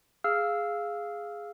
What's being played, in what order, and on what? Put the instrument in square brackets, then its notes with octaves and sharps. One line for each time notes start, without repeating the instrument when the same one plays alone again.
[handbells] G#4 F5 E6 F6